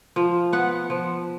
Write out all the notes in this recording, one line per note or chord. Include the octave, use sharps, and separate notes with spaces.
F3
B3 F#5
F3